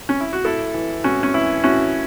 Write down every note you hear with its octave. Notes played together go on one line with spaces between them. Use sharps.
C#4
E4
F#4
A2 E4 A4
E3
A2 C#4 F#4
C#4
E3 E4
A2 C#4 F#4